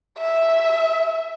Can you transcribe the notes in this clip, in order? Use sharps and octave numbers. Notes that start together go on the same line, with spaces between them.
E5